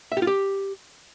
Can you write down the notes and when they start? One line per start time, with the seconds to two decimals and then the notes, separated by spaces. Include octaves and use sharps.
0.12 E5
0.17 G4
0.22 F4
0.27 G4